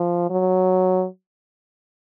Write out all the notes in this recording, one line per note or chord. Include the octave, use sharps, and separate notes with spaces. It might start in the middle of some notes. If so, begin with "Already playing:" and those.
Already playing: F3
F#3